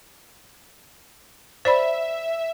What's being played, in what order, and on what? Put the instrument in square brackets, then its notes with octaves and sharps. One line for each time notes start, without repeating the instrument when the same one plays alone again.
[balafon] C5 D5 B5 [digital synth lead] E5